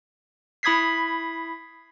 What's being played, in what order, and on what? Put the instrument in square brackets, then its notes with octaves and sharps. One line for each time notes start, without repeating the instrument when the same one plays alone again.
[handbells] E4 B5 D#6 G#6 B6 C7